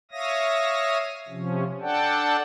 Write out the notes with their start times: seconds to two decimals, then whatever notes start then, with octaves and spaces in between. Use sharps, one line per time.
0.11 C#5 E5 F5 D#6 A#6
1.29 C3 F3 C#4
1.81 D4 A4 D5 F#5 G5 A5